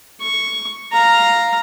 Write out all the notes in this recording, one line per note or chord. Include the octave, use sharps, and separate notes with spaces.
C#6
F5 A#5